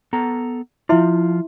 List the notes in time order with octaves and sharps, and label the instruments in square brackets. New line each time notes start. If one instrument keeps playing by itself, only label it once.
[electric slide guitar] B3 A4 A#5
[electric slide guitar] F3 F4 [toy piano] E4 E5 C6